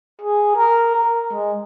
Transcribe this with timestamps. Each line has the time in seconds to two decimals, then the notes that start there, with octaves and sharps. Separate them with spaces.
0.22 G#4
0.56 A#4
0.95 A#4
1.33 G#3